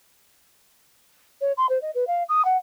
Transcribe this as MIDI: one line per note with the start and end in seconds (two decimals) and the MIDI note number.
1.41 1.52 73
1.57 1.66 84
1.69 1.81 72
1.82 1.91 75
1.95 2.07 71
2.07 2.23 77
2.29 2.44 87
2.45 2.57 78